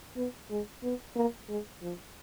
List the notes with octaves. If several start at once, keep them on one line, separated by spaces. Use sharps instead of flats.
B3
G#3
B3
A#3
G#3
F3